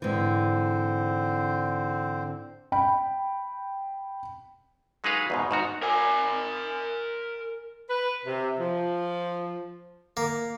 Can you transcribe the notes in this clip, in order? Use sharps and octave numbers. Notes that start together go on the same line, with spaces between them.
G#2 D3 E3 C4 C5
G5 B5
F#3 G#3 D#4 G#4 B4 F5
E2 G#2 B2
G#2 D#3 F#4 A#5
A#4 G#5
B4
C3
F3
A#3